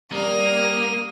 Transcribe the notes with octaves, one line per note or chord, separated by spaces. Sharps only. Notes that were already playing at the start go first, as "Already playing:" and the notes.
G3 A#3 D#6 F6